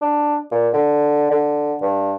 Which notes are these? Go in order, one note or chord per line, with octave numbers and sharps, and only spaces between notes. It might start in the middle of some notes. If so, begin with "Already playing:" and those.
D4
A#2
D3
D3
G2